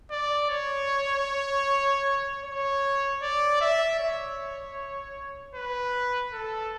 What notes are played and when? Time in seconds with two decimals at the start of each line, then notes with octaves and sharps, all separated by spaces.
0.11 D5
0.50 C#5
2.45 C#5
3.23 D5
3.61 E5
4.00 C#5
5.55 B4
6.33 A4